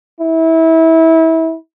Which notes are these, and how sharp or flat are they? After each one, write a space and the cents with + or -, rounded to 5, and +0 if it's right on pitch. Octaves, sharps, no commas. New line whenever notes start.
E4 -25